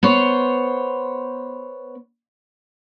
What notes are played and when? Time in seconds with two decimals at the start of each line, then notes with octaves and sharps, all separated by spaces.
0.03 B3 C5 C#5